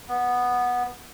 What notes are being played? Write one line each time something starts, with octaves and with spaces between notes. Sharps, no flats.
B3